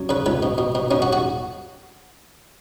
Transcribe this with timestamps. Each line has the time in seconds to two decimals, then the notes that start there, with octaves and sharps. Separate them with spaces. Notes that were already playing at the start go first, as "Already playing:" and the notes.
Already playing: F#2
0.09 C#3 B4
0.26 C#2 B4
0.43 B2
0.58 B2
0.75 B2
0.91 B2 C#4
1.02 F#4
1.13 F#4